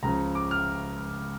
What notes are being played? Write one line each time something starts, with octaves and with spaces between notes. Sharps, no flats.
C#2 C#3 F3 A#5
D6
F6